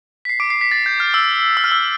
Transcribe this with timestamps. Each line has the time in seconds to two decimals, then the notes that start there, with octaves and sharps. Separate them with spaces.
0.25 B6
0.29 C7
0.40 D6 D7
0.50 C7
0.61 B6
0.71 A6
0.86 G6
1.00 F6
1.14 E6
1.57 E6
1.64 F6
1.72 E6